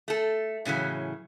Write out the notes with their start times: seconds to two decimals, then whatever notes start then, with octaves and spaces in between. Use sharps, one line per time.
0.08 A3 A4
0.65 A2 C#3 E3 F#3